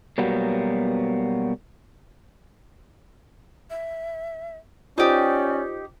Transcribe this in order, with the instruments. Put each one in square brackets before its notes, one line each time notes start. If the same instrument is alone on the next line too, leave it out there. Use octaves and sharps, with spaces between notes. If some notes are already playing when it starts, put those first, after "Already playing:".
[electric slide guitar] B2 F#3 G3 A#3 B3
[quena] E5
[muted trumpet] C#4 [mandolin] D#4 G4 [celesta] F4 C5 D#6 [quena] D5